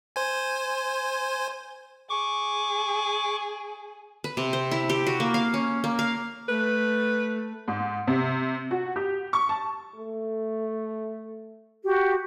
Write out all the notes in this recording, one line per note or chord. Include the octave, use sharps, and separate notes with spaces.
C5 G#5
G#4 C#6 D6
B4
C3
C5
E4
G4
F#4
A#3
F5
C#4
A#3
F5
A3 B4
G#2
C3
F#4
G4
C#6
A5
A3
F#4 G4